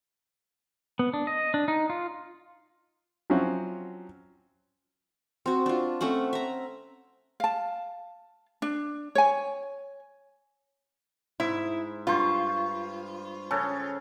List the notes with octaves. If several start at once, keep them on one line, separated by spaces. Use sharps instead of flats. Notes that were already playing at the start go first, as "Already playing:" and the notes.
B3
D4
D#5
D4
D#4
F4
F3 F#3 C4 C#4 E4 F#4
C4 F#4
D4 F4
A3 C4 C#4 F#5
E5 A#5
F5 A5
D4
C#5 G#5
G#2 E4
G2 F4 C5 C#6
C#3 C#4 A4